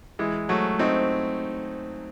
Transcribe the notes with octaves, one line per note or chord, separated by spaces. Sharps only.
E3 G#3
F#3 A3
C4 D#4